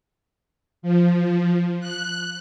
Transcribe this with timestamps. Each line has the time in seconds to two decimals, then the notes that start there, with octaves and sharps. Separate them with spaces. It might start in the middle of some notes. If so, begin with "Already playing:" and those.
0.82 F3
1.80 F#6